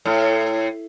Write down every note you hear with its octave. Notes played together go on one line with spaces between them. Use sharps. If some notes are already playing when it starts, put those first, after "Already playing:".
A2